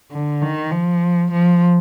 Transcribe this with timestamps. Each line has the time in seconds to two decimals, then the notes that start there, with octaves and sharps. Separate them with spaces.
0.12 D3
0.41 D#3
0.71 F3
1.31 F3